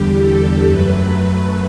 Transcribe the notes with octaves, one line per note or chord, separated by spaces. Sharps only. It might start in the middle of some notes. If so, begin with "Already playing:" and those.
Already playing: E2 D3 G3 G4
A4
F#2 F#3 A3 B4